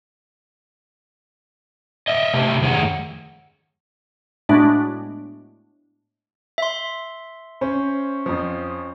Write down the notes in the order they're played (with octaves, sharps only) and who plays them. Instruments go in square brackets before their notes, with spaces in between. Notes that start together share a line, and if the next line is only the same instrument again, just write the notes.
[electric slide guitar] D#5 E5
C3 A3 G4 A#4 A5
F2 D#3 A3 G#4 C#5 F#5
[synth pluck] A2 G#3 A3 B3 D4 F#4
[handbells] E5 C6
[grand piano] C#4 C5
[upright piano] F2 F3